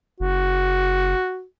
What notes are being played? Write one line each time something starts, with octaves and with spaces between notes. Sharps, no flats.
F#1 F#4